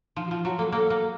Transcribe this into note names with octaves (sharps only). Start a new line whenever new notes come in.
F3 D#4
F#4
F3 F4
F#3 F#4
A#3 A4
A#3 A4
A#3